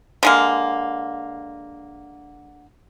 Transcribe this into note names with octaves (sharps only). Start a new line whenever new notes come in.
D3 G#3 A#3